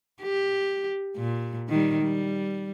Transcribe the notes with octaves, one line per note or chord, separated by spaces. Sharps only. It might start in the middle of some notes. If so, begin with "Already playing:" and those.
G4
A#2
D#3 G3
G3